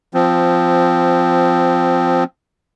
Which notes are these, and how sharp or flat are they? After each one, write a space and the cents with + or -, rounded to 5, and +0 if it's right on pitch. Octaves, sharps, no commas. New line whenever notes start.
F3 +0 C4 -10